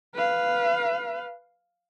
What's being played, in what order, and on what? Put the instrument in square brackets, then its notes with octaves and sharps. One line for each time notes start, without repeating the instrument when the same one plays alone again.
[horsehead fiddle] B4 F5